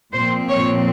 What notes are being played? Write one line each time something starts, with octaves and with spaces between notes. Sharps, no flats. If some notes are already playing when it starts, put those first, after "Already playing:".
A#2 F3 C4 C5
C#5